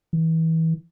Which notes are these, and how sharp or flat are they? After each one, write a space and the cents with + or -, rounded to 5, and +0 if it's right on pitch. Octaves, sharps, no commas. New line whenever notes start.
E3 -30